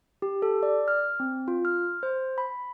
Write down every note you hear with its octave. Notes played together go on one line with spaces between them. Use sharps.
G4
A4
D5
F6
C4
F4
F6
C5
B5